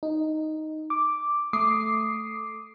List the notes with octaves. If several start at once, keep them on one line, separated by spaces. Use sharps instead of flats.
D#4
D6
A3 D6 D#6 C7